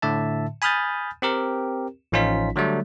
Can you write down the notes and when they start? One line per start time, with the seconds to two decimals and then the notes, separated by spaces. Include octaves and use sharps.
0.02 A2 D3 E5 A5
0.62 G#5 B5 D#6 F6 G6 A6
1.22 C4 G4 A#4
2.12 A1 F3 C#4 D#4 F4 B6
2.56 D3 F#3 G3 A3